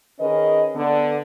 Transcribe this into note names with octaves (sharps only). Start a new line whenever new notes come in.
D#3 C#4 G#4 A#4 B4 D#5
D3 B3